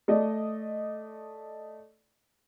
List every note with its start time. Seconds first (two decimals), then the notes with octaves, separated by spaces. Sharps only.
0.08 A3 D5 D#5